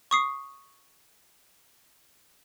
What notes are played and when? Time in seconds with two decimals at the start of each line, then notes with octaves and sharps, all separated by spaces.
0.11 C#6 D#6 C7